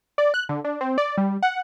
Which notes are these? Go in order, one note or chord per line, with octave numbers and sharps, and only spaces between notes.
D5
F#6
D3
D4
C4
D5
G3
F#5